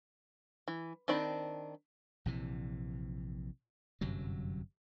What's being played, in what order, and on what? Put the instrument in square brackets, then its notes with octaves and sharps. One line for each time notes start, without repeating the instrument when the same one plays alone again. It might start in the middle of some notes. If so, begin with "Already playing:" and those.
[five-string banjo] E3
D#3 C4 D4 B5
[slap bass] A#1 C3 E3
G1 F#2 C3 F#3